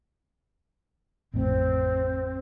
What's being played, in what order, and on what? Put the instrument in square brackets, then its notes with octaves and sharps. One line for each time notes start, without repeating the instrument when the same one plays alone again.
[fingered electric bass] A1 F2 A2 [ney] C4